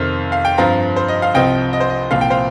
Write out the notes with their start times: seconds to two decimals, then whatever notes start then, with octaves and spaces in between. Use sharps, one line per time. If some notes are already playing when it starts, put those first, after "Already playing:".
Already playing: F2 C3 D#3 C4 F6
0.32 F5
0.45 G5
0.58 G2 F3 C4 F5 A#5
0.96 C5
1.08 D#5
1.22 F5
1.34 C2 C3 F3 C4 D#5 G5
1.73 D#5
1.80 C5
1.90 D#5
2.11 C2 A#2 F3 C4 F5
2.21 G5
2.30 C5 F5